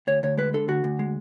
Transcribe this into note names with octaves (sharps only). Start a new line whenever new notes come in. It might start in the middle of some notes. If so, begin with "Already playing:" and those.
D2 C#5
D2 C#5
G#3 B4
D3 A4
D2 F#4
D2
G#3